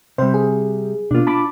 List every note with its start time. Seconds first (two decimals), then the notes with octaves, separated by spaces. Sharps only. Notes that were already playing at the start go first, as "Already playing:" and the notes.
0.18 C3 G3 C5
0.34 G#4
1.11 B2 A#3 D4 F4
1.27 A5 B5 D6